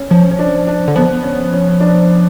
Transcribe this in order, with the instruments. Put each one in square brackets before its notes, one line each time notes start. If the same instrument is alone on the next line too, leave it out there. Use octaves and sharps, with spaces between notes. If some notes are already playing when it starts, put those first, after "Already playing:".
Already playing: [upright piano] C#4
[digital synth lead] F3 [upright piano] C#4
[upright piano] C#4
D4
D4
[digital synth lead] D3
[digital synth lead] F3 [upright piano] B3
[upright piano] C#4
C#4
C#4
D4